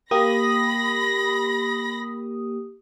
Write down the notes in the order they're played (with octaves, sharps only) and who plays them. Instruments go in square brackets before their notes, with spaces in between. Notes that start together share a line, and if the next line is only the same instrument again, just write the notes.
[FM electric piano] A#3 G4 D#6 [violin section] B5 A#6